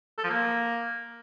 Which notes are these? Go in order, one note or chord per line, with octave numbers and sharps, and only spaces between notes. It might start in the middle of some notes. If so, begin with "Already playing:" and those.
A4
F3
A#3